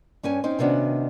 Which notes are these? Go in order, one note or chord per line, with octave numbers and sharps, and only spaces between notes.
G2 C#4 C#5 G#5
C4 C#4 D#4
C3 D#3 B3 C#4 D4 F#4